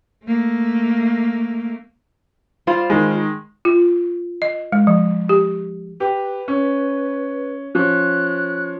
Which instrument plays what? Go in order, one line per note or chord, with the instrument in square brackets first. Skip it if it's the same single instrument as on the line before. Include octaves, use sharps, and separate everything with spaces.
[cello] A3 A#3
[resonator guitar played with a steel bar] G3 F4 C5
[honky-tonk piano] D#3 G#3
[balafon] F4
D#5
G#3
F3
G4
[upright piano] G4 [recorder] B4
[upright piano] C#4
[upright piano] F3 C#4 [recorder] F#6